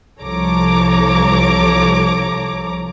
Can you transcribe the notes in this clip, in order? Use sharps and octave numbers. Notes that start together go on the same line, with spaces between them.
C2 F3 A4 C#5 A#5 D6